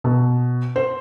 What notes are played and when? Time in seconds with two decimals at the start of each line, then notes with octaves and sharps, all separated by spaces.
0.04 B2
0.76 C5